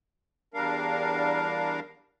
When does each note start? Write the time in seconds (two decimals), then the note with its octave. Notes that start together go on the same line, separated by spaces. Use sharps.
0.54 E2 G3 D4 A#4 F5